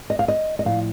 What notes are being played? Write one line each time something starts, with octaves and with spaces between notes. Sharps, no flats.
D#5
F5
D#5
D#5
A2 F3 F5